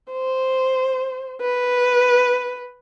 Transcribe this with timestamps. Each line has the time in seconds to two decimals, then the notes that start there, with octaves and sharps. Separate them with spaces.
0.12 C5
1.41 B4